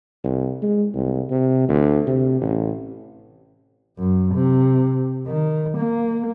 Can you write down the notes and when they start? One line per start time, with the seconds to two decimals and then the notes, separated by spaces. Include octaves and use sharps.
0.24 C2
0.62 G#3
0.94 C2
1.30 C3
1.68 D2
2.07 C3
2.41 A1
3.99 F#2
4.35 C3
5.28 D#3
5.78 A#3